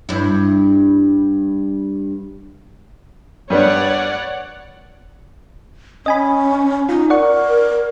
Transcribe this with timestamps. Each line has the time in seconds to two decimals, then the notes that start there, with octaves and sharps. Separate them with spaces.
0.09 G2 E4
3.50 G2 G3 B3 C#5 D5 F#5
6.06 C#4 D#5 G#5 B5
6.89 D#4 F4
7.10 A#4 D5 F#5 C#6